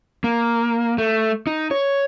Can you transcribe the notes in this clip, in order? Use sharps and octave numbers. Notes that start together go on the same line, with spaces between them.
A#3
A3
D#4
C#5